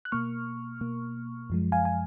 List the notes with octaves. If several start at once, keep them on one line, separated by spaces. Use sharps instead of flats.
F#6
B2 A#3 C#6 F6
B2 A#3
F#2 F3 G#3
F5 G#5
G#5